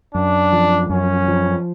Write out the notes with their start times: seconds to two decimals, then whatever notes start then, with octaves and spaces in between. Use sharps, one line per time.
0.14 F#2 D4
0.53 F3
0.90 F#2 C#4
1.28 F3